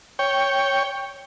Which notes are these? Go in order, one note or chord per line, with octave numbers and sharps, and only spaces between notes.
C#5 G5